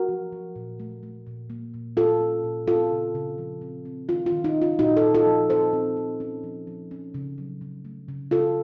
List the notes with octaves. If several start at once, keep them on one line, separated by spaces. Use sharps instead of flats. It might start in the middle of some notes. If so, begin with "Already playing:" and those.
Already playing: F#4 A#4
F3
F3
A#2
A3
A3
A#2
A#3
A#2
A#2 F4 A4
C#4
A#2
C4 F4 A4
C#3
C#3
F3
C4
C4
D#3 F4
F4
D#3
D#4
C#4
F4
A#2 D#4 F#4
F4 A4
A#2
F4 A4
F3
C4 A4 C5
C4
C4
C#4
F3
F3
C#4
C#3
F#3
C#3
A3
C#3
C#3 F4 A4